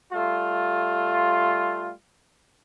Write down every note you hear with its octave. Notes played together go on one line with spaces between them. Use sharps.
G3 A3 F4